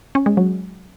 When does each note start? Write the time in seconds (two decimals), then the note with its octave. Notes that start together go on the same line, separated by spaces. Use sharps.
0.15 C#4
0.26 G#3
0.37 F#3